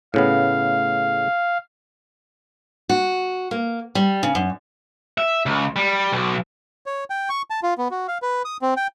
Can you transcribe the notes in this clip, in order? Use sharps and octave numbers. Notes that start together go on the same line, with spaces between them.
A2 C#3 B3 F5
F#4
A#3
G3
C#3
F#2
E5
C#2
G3
B1
C#5
G5
C#6
A5
F4
B3
F#4
F5
B4
D#6
C4
G5